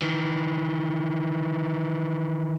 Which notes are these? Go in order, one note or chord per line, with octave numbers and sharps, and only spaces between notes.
D#3 E3